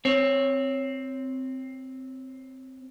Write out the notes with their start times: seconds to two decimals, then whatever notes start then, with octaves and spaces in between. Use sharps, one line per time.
0.05 C4 C#5